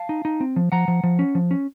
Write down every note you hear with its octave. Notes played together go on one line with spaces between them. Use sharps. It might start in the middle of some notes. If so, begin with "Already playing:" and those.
Already playing: F5 A5
D#4
D#4
C4
F3
F3 F#5 A#5
F3
F3
C#4
F3
C#4